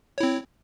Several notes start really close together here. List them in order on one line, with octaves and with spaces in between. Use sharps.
C#5 E4 C4